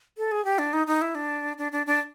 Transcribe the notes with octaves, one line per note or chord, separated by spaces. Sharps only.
A4
G#4
G4
D4
D#4
D#4
E4
D4
D4
D4
D4